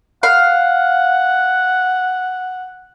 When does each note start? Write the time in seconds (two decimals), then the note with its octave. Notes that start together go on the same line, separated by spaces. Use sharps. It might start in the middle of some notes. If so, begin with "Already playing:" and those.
0.23 F5 F#5